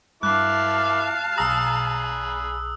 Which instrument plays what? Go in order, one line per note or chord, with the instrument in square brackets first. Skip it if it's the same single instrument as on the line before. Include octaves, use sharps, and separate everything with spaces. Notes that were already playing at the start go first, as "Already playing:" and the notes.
[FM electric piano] G2 [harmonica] E4 D6 [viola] F5 A5 [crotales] F#6
[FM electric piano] B1 A#5 [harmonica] G#4 B5 [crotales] D#6 E6